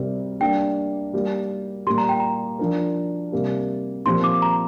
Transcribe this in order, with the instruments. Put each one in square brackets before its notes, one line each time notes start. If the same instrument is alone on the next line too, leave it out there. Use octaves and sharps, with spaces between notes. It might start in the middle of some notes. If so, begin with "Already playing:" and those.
Already playing: [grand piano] C3 G3 C4 A#4
[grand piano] G3 A#3 D4 A#4 [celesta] G5
[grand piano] G3 A#3 G4 A#4
[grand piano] A#2 G3 A#3 G4 [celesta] C6
[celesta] A#5
G5
A#5
[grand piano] F3 D4 A#4
C3 G3 A#3 G4
[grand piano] A#2 F3 C4 G4 A#4 [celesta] C6
[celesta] D6
A#5